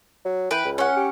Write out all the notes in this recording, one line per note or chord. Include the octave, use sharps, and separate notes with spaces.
F#3
E3 B4 G5
C#2
C#4 F#5
G4